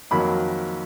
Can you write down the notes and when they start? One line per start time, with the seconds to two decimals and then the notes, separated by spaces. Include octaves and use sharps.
0.11 F2 D#3 F#3 A#3 B5